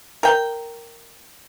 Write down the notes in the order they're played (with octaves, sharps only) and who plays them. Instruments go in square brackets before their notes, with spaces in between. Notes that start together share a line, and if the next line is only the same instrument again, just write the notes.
[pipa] A#4 G5